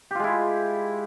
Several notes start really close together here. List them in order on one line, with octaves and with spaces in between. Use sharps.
G4 F4 G#3 E4